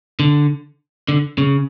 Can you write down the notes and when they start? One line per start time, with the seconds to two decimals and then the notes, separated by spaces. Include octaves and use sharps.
0.20 D3
1.09 D3
1.38 C#3